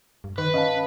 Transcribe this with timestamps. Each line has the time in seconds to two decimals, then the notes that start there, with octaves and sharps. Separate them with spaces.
0.24 G2
0.38 D#3 B4
0.54 C#4 D#5 F5 A5